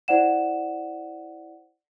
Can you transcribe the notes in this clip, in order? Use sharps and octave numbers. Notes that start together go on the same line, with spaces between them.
E4 C5 D5 F#5 E7